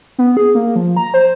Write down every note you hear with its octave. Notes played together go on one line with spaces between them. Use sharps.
B3
G#4
A#3
F3
A#5
C5